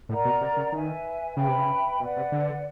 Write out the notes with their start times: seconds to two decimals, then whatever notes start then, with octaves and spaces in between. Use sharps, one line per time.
0.09 A2 A#4 D5 F#5 A#5
0.25 B2
0.41 C3
0.57 C#3
0.72 D#3 B4 E5 G#5
1.36 C#3 B4 E5 G5 B5
1.48 C3
1.58 C#3
2.00 B2 B4 D5 F#5
2.17 C3
2.32 D3